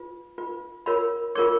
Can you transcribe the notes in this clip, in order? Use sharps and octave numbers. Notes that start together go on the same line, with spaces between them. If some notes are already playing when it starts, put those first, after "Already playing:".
Already playing: F4 B4
F4 B4
F4 A#4 C#5 B5
F4 A#4 C#5 C#6